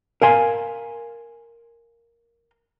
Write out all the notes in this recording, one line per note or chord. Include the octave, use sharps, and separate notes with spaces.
A#4 F5 G#5 C6